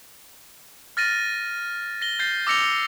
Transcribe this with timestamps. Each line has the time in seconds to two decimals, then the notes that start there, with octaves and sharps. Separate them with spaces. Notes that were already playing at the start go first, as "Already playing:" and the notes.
0.97 F6 A6 A#6 D#7
2.02 A#6 G7
2.19 G6 A6 C7
2.47 D6 E6 A#6 C#7 F7 G7